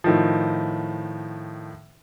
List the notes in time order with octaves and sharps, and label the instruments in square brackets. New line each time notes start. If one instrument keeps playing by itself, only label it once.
[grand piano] A2 D#3 F3